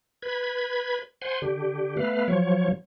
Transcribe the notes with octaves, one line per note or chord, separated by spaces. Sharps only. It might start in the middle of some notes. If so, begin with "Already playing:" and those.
B4 B5 G#6
C5 F#5 G#5 C6
D3 G4
A3 B3 B4 F5
F3 F#3 C#5